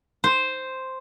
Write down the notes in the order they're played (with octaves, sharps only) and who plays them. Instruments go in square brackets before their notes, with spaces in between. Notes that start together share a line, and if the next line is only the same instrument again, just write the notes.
[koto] C5